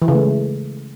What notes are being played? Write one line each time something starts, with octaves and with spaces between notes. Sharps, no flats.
E3
C#3
A3
G#3